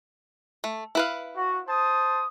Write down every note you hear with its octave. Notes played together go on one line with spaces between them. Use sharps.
A3
E4 B4 F5
F#4
C5 A5 D#6